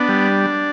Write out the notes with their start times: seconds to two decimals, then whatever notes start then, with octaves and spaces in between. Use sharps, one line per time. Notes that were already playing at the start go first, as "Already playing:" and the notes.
Already playing: B3 D4
0.09 G3